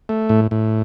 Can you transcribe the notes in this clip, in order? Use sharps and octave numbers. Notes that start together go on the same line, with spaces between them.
A3
A2
A2